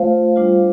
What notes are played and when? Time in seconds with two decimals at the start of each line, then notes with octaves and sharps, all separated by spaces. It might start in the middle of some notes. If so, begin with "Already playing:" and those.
Already playing: A3 F4 C5 F5
0.36 G3 D4 F4